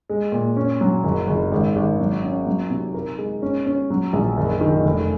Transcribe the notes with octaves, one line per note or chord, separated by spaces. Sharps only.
G#3
A#2
C#4
F#3
F#1
F#1
G#1
G#1
F#3
C#4
F#3
C3
A#4
G#3
C#4
C#4
F#3
A#1
F#1
D#3
F1